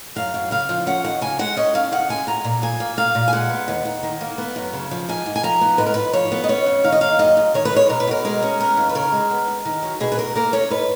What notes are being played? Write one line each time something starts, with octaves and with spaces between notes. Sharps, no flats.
F#2 F5
F#2
C#3 F5
F3
C#4 F#5
D#2 F#5
C#3 G#5
G#3 F#5
C#4 D#5
D#2 F5
C#3 F#5
G#3 G#5
A#2 A#5
A#2
F3 G#5
A#3
A#2 F5
A#2
G#5
G#3 F#5
B3
D#2
D#2
D#3
A#3
B3
F#2
C#3
F3
G#2 G#5
G#2
G#5
F3 A#5
B3
G#2 B4
A#4
G#2 B4
F3 C#5
B3
D#5
C#4 C#5
F2
D#3 F5
D#5
A#3 F5
F#2 D#5
F#2
D#3 C#5
B4
G#3 C#5
B2 A#4
B4
B2 A#4
G#3 A#4
C#4
B3 A#4
D#2
B4
C#3 A#4
G#3
B3
F#2
D#3
F#3
B2 G#4
B4
B2 A#4
A#3 A#4
C#4 C#5
G#2 B4